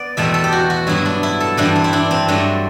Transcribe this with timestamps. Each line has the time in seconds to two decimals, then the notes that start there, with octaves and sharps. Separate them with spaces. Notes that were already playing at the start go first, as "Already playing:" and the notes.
Already playing: B3 D5
0.17 E2 B2 A3 C4 E5
0.34 A4
0.44 G4
0.52 F#4
0.70 F#4
0.87 G2 F#3 B3 E4
1.05 D4
1.23 E4
1.40 A4
1.57 G2 E3 G3 D4
1.76 C4
1.84 E4
1.93 D4
2.11 C4
2.28 G2 F#3 A3 D4